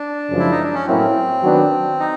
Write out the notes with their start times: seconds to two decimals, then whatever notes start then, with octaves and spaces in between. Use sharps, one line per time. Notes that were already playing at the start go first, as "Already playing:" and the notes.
Already playing: D4
0.29 F#2 C#3 F3 G#3
0.39 E4
0.52 D#4
0.63 D4
0.75 C#4
0.87 A2 F#3 A#3 C4 C#4 E4
1.43 D#3 F#3 B3 D4 F#4
2.00 D#4